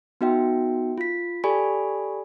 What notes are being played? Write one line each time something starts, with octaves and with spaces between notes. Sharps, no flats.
B3 D#4 F#4 E5 G5
F4 B6
G4 A4 D5 G#5 B5 C#6